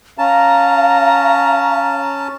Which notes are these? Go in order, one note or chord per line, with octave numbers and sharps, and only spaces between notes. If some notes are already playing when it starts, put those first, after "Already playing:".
C#4 F5 A5 A#5